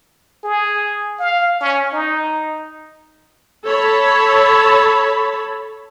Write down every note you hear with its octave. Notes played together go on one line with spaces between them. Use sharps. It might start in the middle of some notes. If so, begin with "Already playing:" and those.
G#4
F5
C#4
D#4
A4 C#5 A5 B5